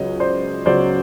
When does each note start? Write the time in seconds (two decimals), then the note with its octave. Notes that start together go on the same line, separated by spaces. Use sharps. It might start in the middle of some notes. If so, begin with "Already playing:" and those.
Already playing: C#2 C#3 F#3 C#5 D#5
0.20 C5 D5
0.66 C#2 C#3 F#3 C5 D5